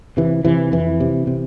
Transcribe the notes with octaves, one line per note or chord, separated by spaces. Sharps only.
C3 E3
C3 E3
F2 E3
C3
C3